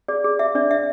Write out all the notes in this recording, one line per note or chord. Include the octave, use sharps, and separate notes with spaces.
G#4 D5
G#4
G#4 E5
D4 D5
D4 E5